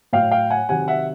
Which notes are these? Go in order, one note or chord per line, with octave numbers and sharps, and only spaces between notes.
A2 F#3 F5 G5
F5 G5
F#5 G#5
C3 D#3 F#3 F#5 G#5
E5 F#5